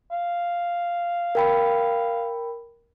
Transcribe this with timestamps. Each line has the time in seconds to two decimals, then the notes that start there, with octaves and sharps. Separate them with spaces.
0.11 F5
1.35 A#4 G5 B5